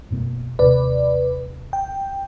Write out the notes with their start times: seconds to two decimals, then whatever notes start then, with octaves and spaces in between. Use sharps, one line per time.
0.11 F#2 B2 A#3
0.59 D#2 C3 B4 D5
1.73 G5